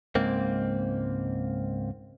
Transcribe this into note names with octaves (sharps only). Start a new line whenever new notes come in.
C#2 G#2 A#3 C4